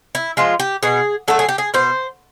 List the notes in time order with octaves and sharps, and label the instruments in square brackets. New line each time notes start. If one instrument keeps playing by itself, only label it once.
[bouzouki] E4
F3 G#3 F4
G4
B2 G#4
F#3 A3 A4
G#4
G4
G#4
B2 C5